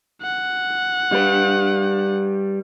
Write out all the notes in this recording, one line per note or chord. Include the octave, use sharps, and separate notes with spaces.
F#5
G3 B4